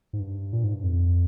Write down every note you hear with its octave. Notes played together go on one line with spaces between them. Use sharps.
G#2
G2
A#2
G#2
G2
F2